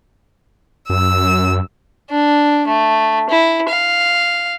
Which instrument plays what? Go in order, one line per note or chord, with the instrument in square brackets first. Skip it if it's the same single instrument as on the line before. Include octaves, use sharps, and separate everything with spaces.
[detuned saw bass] F#2 [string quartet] E6
[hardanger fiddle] D4
A3
E4
F5